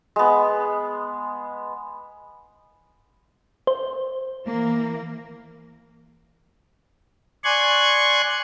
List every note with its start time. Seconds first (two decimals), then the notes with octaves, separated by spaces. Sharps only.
0.16 G#3 B3
3.67 C5
4.46 E3 A#3
7.44 D5 G#5 C6 C#6 F#6 G#6